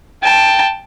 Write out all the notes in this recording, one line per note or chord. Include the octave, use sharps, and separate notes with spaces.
G5 A5